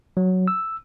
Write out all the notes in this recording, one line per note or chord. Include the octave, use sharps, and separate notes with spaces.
F#3
E6